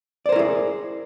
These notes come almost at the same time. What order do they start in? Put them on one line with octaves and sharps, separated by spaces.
D5 C5 A#4 E4 G#4